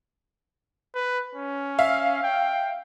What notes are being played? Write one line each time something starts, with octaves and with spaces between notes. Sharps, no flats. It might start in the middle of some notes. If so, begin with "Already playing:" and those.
B4
C#4
E5 F5
G5